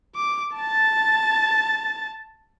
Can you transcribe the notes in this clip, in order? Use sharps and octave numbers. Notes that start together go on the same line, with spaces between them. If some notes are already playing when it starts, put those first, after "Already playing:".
D6
A5 A6